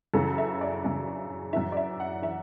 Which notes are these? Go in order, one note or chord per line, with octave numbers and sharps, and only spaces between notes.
F#2 C#3 E3 A4
E5
D5
F#2 C#3 E3
F#2 E3 E5
D5
E5
F#5
E3 E5